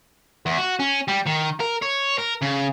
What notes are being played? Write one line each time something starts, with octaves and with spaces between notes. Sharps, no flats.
E2
F#4
C#4
G3
D#3
A#4
C#5
A#4
C#3